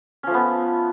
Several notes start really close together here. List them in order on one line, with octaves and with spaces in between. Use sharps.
C#4 F3 A3 B3